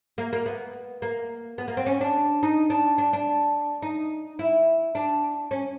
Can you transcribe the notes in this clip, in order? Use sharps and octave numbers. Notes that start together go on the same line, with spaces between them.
A#3
A#3
B3
A#3
B3
A#3
C4
C#4
D4
D#4
D4
D4
D4
D#4
E4
D4
C#4